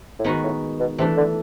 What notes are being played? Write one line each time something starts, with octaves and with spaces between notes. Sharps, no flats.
A2
G#2 D#3 G#3 B3 D#4 F#4
A2
B2
C3 E3 A3 D4
D3